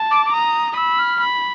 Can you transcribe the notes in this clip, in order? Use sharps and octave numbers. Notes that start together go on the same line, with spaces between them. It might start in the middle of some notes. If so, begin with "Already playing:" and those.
Already playing: A5
D6
D6
A#5 D#6
D#6
B5 E6
F6
B5